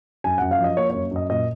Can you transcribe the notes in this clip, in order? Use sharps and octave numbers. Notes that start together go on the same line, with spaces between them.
F#2 G#5
F#2 F#5
F5
F3
D#5
A#3 C#5
F#2 C#5
F#2 D#5
A#2 D#5